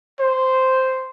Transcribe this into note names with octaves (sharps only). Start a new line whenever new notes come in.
C5